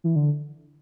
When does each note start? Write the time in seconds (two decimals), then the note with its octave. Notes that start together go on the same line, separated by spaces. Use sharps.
0.04 E3
0.16 D3